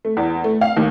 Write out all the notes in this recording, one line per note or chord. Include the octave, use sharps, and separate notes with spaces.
A3
E2
A3
F5
D#2